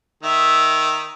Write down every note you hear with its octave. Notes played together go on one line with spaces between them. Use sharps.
D#3 E5